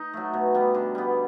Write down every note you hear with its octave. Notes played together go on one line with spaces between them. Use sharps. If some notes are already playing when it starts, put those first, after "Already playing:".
Already playing: D#4
F#3 A3
B2
G3 B3
D3
G3 B3